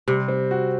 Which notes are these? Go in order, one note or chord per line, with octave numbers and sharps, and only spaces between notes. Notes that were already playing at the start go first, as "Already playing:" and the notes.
C3 G3
C4
F#4